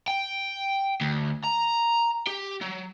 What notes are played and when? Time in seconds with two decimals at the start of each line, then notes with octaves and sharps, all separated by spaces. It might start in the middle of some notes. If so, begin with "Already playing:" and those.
0.08 G5
1.01 D2
1.44 A#5
2.27 G4
2.61 F#3